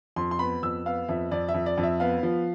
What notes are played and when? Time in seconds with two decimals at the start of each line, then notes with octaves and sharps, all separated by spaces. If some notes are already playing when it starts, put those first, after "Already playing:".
0.16 F2 C6
0.31 C6
0.39 B3 B5
0.63 F2 E6
0.86 B3 F5
1.08 F2 E5
1.31 F2 D5
1.49 E5
1.54 F2
1.66 D5
1.78 F2
1.83 E5
2.00 B3 F5
2.23 F3